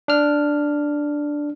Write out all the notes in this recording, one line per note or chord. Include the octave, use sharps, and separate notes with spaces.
D4 F6